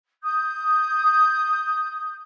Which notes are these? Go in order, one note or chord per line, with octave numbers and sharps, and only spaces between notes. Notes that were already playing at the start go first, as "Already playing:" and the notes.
D#6 G6